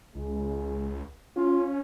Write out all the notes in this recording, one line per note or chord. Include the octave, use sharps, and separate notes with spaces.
C#2 G#3
C#4 F4